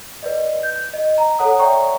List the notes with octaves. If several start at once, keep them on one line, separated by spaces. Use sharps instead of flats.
B4 D5 D#5
G6
D#5
A#5
A4 C#5 F#5 A#5 D#6
C#5 D5 E5 G5 A#5 C#6